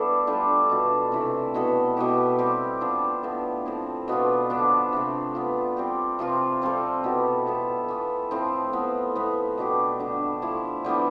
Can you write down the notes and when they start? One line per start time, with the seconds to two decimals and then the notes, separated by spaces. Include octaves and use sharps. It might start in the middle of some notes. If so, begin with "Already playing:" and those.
Already playing: G3 A3 B3 D4 E4 A4
0.27 G3 D4 F4 A4
0.70 B2 A3 D4 A4
1.12 C3 E3 A3 E4
1.54 B2 B3 E4 A4
1.97 B2 B3 E4 G4
2.39 G3 C4 G4
2.81 F3 B3 D4
3.23 A2 F3 B3
3.65 F3 C4 E4
4.08 B2 B3 D4 F4
4.50 D3 F3 B3 D4
4.93 C3 F3 A3
5.35 G3 B3 F4
5.77 G3 C4 G4
6.19 C3 F3 C4 F4
6.62 G3 C4 F4 A4
7.04 B2 B3 E4 G4
7.46 F3 B3 E4 A4
7.88 E3 B3 F4
8.31 A2 F3 C4
8.73 A2 F3 B3
9.15 A2 F3 B3
9.58 B2 A3 D4 G4
10.00 D3 G3 D4
10.42 F3 A3 E4
10.84 D3 G3 B3 E4